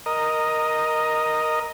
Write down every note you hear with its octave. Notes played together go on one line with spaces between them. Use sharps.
A#4 D#5